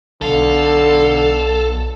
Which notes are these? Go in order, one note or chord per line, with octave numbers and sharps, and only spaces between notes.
B1 D3 A4 F5